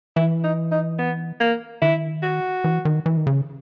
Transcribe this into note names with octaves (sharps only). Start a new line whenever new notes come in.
E3 E4
D#4
D#4
B3
A#3
D#3 E4
F#4
E3
D#3
E3
D#3
C#3